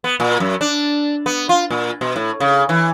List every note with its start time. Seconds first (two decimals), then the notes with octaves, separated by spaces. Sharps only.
0.04 B3
0.20 A#2
0.40 F#2
0.61 D4
1.26 B3
1.49 F4
1.71 A#2
2.01 B2
2.16 A2
2.40 C#3
2.69 E3